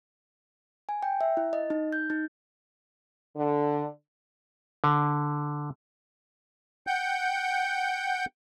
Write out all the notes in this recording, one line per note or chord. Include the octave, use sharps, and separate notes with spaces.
G#5
G5
E5
E4
D#5
D#4
G6
D#4
D3
D3
F#5 G5 G6